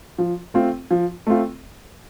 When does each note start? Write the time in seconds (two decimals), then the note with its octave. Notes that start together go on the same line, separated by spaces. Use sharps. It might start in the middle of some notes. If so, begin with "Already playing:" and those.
0.18 F3
0.54 A3 C4 F4
0.91 F3
1.27 A3 C4 F4